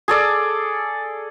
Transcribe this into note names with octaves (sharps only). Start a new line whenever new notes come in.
G#4 A4 D5